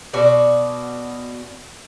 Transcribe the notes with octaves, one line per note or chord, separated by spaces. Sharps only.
B2 F#4 D5